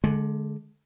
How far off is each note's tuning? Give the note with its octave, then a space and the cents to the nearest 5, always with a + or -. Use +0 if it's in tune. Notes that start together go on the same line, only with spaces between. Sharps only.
D3 +0 G#3 +30